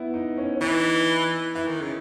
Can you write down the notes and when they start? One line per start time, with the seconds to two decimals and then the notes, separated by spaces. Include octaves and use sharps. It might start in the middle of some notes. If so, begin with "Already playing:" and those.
Already playing: B3 E4
0.14 D#4
0.37 C#4
0.61 E3 D#4
1.55 E3 E4
1.67 D#3
1.81 C#3